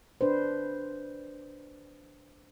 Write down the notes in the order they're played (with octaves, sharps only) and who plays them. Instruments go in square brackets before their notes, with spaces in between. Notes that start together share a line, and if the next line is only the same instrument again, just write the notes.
[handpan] D4 B4 C5